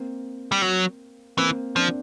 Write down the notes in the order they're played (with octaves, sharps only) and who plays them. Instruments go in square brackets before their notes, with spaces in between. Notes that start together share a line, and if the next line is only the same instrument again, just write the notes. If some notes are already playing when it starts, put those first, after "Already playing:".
Already playing: [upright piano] A#3 C4
[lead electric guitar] G3
F#3
[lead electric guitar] E3 [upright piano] A#3 C4
[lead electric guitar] F3 [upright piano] C4 D4